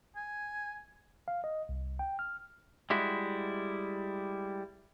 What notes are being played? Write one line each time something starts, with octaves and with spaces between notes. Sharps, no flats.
G#5
F5
D#5
C2
G5
F6
G3 G#3 E4 F#4